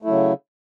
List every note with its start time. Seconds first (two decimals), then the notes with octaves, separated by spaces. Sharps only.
0.02 A3
0.05 E4
0.07 F#3
0.10 C#3